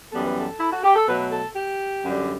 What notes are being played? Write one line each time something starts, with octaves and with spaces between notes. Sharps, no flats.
F#2 E3 G3 B3 A4
B4
A4
E4
F#4
G4
A4
B2 F#3 A3 B4
A4
G4
F#2 D3 G3